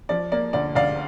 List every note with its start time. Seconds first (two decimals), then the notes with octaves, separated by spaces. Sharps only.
0.09 F3 D5
0.32 A#3 D5
0.53 D2 D5
0.75 D2 D5 F5